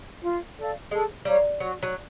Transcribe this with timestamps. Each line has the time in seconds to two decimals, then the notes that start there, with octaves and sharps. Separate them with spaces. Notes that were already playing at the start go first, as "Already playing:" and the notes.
0.23 F4
0.57 A4 D5 F5
0.91 G#3 A4
1.25 G3 C#5 F5 A#5
1.60 F#3 F#4
1.83 F#3